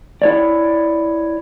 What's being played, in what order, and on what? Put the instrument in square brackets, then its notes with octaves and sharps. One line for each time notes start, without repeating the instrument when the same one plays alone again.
[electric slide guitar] E4 C#5 D5